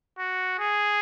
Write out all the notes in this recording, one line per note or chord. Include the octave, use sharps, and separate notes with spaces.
F#4
G#4